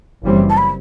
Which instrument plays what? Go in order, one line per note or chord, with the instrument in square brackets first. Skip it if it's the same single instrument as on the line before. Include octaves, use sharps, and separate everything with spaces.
[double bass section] F#1 F#2 E3 G3 C4
[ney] A5
B5